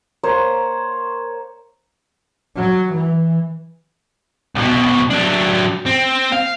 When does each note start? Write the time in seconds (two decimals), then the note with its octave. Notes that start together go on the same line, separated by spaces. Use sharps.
0.23 A#3 C5 C#5 A#5
2.56 F#3
2.93 E3
4.55 C2 B2
5.11 F#3 D4
5.86 C4
6.32 F5